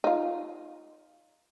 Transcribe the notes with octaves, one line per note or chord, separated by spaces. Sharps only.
D#4 F4